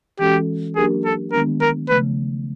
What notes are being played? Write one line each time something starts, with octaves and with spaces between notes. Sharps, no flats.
E3 G#3 C#4 F#4 G4 A4
F#3 A#3 D4 G4 G#4 A#4
A4
D#3 G#3 B3 D4 A#4
A#4
C#3 F3 A3 B4